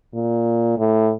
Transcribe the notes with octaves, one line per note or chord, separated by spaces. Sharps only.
A#2
A2